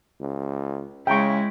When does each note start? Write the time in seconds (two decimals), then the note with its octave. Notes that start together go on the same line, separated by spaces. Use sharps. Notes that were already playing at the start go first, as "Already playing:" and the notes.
0.21 C#2
1.07 C#3 G#3 E4 G5 A#5 C#6